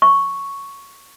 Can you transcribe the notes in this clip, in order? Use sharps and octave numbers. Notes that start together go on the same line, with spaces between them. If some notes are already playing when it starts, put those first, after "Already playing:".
C#6